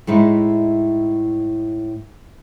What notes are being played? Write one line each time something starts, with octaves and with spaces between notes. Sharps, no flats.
A2 G#3 D#4 E4